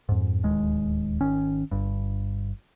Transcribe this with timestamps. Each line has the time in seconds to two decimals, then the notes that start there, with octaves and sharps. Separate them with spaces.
0.09 F2 G#2
0.43 D1 D#2 G#3
1.20 G#1 D#3 C#4
1.71 G1 G2